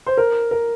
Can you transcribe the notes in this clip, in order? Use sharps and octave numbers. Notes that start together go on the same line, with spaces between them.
C5
A#4
A#4